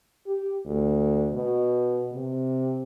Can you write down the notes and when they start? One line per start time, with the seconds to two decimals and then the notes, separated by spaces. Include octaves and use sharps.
0.27 G4
0.65 D2
1.33 B2
2.13 C3